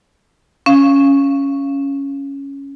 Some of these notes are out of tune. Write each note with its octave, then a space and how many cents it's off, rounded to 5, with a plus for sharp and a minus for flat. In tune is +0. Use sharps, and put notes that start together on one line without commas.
C#4 +0 F5 -15